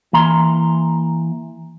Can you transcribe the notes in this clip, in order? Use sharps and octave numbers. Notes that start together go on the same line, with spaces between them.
E3 A#3 A#5 C6